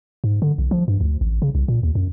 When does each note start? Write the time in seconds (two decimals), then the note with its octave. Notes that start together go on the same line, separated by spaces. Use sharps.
0.24 G#2
0.42 D3
0.58 B1
0.71 F3
0.88 G2
1.01 D2
1.21 A1
1.42 C#3
1.55 C2
1.68 A#2
1.83 D#2
1.95 F#2